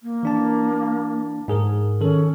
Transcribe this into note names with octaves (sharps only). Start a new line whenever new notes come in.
A#3
E3 D4 A5
G#2 G#4 A#4
D#3 C#4 A4